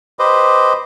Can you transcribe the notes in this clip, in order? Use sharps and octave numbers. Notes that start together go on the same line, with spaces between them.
G4 B4 C5 D#5